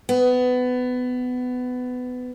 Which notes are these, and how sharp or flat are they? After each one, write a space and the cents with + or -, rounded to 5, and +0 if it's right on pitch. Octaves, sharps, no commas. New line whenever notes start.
B3 +20